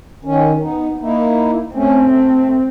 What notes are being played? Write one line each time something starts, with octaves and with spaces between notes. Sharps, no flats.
D#3 C#4
B3 D#4
A#3 D#4 E4
A3 C4 C#4
A3